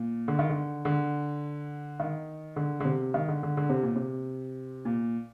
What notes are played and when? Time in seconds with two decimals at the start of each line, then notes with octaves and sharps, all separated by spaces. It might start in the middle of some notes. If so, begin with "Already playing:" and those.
Already playing: A#2
0.28 D3
0.39 D#3
0.49 D3
0.85 D3
2.00 D#3
2.56 D3
2.80 D3
2.85 C3
3.14 D#3
3.28 D3
3.43 D3
3.57 D3
3.70 C3
3.83 A#2
3.96 C3
4.85 A#2